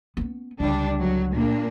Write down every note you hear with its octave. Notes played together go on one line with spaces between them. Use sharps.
B3 C#4
C#2 D3 G3 D4
F#3
A#2 A#3 D4